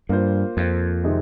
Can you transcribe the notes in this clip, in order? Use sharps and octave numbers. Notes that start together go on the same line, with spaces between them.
G2 A#3 F4 C5
F2 A#3 F4 C5
C3 D#3 G#3 C4 D#4